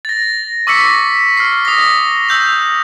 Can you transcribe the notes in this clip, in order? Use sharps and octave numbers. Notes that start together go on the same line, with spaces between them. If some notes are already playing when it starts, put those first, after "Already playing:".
A6 A#6
C#6 D6 E6 A#6 B6 C#7
F6 C7
D#6 A#6
E6 G6 F7